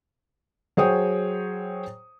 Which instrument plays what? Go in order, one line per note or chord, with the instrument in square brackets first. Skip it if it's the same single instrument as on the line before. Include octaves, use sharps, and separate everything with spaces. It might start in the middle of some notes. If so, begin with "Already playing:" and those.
[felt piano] F#3 G#4 C5 C#5 G5 D#6